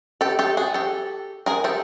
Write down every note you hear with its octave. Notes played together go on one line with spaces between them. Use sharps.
G4 A4
G4 A4
F#4 G#4
G4 A4
G#4 A#4
G4 A4